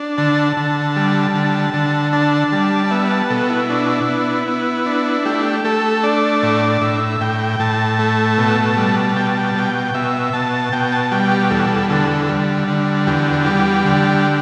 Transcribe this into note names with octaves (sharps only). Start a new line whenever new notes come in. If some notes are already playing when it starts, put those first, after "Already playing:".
Already playing: D4
D3 A5
D3
G3
D3
D3
D4 A5
G3
D5
B3 E5
A5
B2 A4
E4
D4
B3
B3
D4
A3 G4
E4
G4
A3 A4
D4 D5
A2
A2 E5
A2 G5
A2 A5
A3
B2
G3
B2 G5
A5
G5
A5
B2 G5
B2 E5
B2 A5
B2 G5
A5
G3 G5
G4
E2 A4
D3 A4
G3
D3
E2 G4
G3
D3